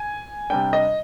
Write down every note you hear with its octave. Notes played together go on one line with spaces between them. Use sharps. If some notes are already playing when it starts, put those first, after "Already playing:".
Already playing: G#5
C3 G3 D4 G5
D#5